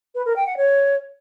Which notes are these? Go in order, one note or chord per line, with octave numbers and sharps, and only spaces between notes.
B4
A#4
G5
F#5
C#5